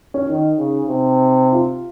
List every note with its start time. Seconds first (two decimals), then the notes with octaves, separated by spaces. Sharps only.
0.14 C#4
0.26 D#3 D#4
0.58 C#3
0.89 C3
1.52 F4